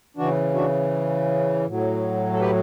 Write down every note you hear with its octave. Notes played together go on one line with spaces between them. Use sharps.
C#3 E3 D4 F#4
D4 F#4
A2 F#3
A4
G4 B4